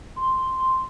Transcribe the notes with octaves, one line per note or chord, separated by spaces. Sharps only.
C6